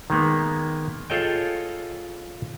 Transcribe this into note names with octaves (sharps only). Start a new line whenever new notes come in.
D#3 G#3 A#3 B3
F4 G#4 A4 C#5 D#5 G5